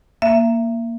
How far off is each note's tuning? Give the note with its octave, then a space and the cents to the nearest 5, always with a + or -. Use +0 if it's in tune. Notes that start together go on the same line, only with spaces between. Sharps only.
A#3 +0 E5 +30